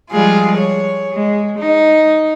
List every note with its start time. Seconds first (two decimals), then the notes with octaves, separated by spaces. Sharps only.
0.12 F3 G3 G#3 F4 G#4
0.58 C#5
1.13 G#3
1.58 D#4